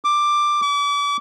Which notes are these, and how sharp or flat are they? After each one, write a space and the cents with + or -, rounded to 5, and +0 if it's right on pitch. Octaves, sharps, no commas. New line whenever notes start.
D6 +10
D6 -35